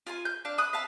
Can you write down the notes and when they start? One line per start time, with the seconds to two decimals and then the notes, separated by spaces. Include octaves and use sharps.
0.07 F4 G#5 C6
0.25 G6
0.45 D4 F5
0.58 B5 D#6 F#6
0.73 E5 F5 A5